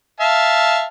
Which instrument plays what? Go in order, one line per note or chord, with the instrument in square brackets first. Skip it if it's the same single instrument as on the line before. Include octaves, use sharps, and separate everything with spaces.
[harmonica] E5 F5 A5